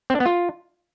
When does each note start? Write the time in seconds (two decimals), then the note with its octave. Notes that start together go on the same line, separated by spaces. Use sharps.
0.10 C4
0.15 D4
0.20 B3
0.26 F4